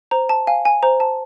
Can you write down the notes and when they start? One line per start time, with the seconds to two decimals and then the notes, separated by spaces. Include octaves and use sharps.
0.11 C5 A#5
0.29 A5
0.47 F5 G#5
0.65 G#5
0.83 C5 A#5
1.00 A5